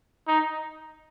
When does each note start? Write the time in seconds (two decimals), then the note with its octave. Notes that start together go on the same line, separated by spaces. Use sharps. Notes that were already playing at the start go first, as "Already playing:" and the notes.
0.28 D#4